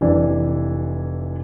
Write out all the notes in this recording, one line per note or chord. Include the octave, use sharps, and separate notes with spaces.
F1 E3 D4